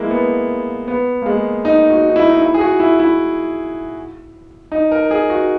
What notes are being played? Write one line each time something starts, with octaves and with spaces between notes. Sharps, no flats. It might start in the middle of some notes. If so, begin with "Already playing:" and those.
Already playing: G#3 A#3 E4
B3
B3
A#3
G#3
D#4
F#4
D#4
E4
D#4
E4
G#4
F#4
E4
E4
D#4
A#4
G#4
F#4